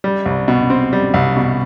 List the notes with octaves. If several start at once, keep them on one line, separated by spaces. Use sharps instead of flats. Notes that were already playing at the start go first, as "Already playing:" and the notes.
G3
C2
B2
C4
G3
C2
B2